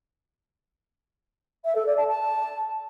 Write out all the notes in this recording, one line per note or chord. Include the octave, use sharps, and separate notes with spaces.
E5
A4
D5
A5
A5